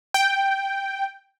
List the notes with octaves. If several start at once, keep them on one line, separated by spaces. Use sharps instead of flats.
G5